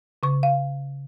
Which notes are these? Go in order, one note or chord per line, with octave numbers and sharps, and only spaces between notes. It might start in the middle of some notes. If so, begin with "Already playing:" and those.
C#3 C#6
F5